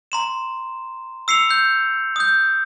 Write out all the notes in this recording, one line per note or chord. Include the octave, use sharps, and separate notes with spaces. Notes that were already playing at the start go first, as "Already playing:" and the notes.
A#5 C6 E7
E6 C7 C#7 F7
G6
D#6 G6